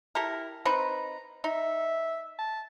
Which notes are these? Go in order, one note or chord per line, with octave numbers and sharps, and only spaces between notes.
E4 G4 A4 A#4
C4 D#4 B4 A#5
D#4 E5
A5